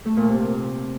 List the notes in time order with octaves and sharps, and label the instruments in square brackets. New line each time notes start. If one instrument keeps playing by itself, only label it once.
[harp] A3
A#2
C3